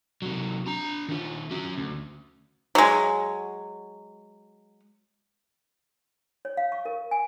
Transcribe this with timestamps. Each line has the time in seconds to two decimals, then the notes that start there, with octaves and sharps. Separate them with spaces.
0.22 C3 F#3
0.67 D4 A#5
1.09 D#3 F4
1.51 C#4 F#4
1.77 D2
2.75 F#3 G#3
6.45 C#5
6.57 F5
6.72 C#6
6.85 A#4
7.11 G#5